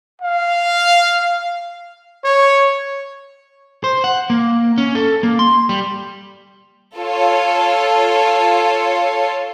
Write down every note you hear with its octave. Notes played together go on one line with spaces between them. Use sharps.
F5
C#5
C5
F#5
A#3
C#4
A4
A#3
C6
G3
F4 A4 C#5